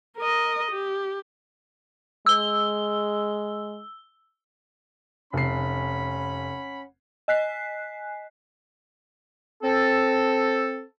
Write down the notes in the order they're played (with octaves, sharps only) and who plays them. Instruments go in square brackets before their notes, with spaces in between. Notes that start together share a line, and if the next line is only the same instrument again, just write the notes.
[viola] A#4 D#5
G4
[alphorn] G#3 [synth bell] E6 G7
[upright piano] F1 C7 [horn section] C#4 F#5 B5
[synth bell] D#5 G#5 F#6 B6 C7
[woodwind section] C4 A4